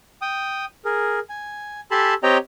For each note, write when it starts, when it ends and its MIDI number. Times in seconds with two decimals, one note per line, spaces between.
0.22 0.65 79
0.22 0.65 87
0.85 1.19 68
0.85 1.19 70
1.29 1.80 80
1.91 2.14 67
1.91 2.14 69
1.91 2.14 80
1.91 2.14 81
1.91 2.14 83
1.91 2.14 84
2.23 2.37 60
2.23 2.37 67
2.23 2.37 73
2.23 2.37 75
2.23 2.37 79
2.23 2.37 82